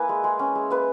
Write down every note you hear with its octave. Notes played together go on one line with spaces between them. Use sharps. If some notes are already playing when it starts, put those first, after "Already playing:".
Already playing: A#3 E4 B4 G#5
G#3
G#3
C#4
G#3
A#3 B4